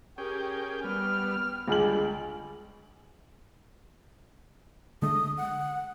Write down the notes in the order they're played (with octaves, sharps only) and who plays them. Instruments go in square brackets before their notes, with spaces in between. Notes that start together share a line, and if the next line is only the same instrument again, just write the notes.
[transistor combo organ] C#4 G#4 G5 [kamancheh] G4 A#4
[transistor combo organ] G3 B3 [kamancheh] F6
[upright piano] C#2 G#3 F#7 [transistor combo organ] D3 G3
[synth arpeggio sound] D3 G#3 A3 [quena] D#6
[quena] F#5